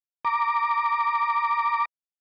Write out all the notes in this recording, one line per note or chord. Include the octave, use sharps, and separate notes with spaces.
A#5 D6